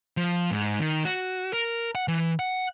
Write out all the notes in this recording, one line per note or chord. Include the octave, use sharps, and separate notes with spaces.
F3
G#2
D#3
F#4
A#4
F#5
E3
F#5